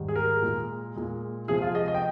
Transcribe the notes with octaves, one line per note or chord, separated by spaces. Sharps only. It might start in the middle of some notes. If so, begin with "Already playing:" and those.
Already playing: G#2 D#3 G3
G#4
A#4
A#2 G#3
A#2 G#3
C3 F3 G#3 G#4
F4
D#5
D#5
G5